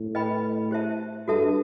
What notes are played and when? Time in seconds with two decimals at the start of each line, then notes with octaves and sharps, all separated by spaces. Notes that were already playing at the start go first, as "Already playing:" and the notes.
Already playing: A2
0.15 B4 D#5 G5 B5
0.71 G4 C5 E5 A5
1.28 G2 F#4 A4 E5 A5